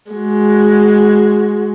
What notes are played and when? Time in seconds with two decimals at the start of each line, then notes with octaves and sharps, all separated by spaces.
0.11 G#3 F#4